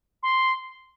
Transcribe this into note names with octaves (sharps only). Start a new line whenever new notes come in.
C6